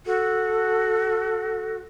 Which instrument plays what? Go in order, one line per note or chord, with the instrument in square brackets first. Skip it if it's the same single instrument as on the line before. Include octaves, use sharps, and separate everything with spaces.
[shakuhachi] F#4 [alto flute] A4